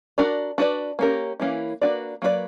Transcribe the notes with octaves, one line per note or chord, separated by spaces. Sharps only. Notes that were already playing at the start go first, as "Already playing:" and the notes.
D4 F#4 A#4 D5
D4 F#4 B4 D5
A#3 C#4 G4 A#4
E3 A#3 C#4 E4
A#3 D4 F#4 B4 D5
F#3 A#3 E4 B4 D5